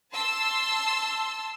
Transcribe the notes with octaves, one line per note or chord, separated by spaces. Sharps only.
A5 C6 E6